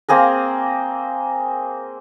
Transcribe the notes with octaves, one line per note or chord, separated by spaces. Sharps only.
A#3 C4 G#4 A#4